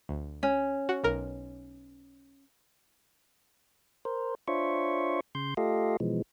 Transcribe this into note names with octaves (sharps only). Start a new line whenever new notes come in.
D2
C#4
F#4
B1 A#4
A#4 C5
D4 F4 C5 C#5 E5 C#6
C#3 C6 G6
A3 F4 G4 A4 D#5 F5
B2 E3 F3 G#3